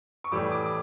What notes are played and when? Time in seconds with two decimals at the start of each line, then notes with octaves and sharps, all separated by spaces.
0.24 C#6
0.31 A2 E3 G3 D6
0.52 D6
0.66 D6